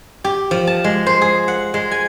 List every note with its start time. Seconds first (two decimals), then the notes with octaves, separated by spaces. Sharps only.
0.24 G4
0.51 F3
0.67 A5
0.84 G#3
1.06 C5
1.21 G#4
1.48 F#5
1.74 G#3
1.91 G#5